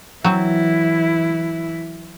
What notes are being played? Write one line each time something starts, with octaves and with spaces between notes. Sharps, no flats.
E3 F#3 C4 E4